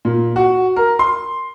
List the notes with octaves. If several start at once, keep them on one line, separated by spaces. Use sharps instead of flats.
A#2
F#4
A#4
C6